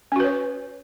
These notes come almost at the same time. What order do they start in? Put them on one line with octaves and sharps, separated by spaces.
C#4 F#4 B4 C#5